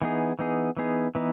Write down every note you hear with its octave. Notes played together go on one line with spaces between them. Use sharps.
E3 B3 D#4 G#4
E3 B3 D#4 G#4
E3 B3 D#4 G#4
E3 B3 D#4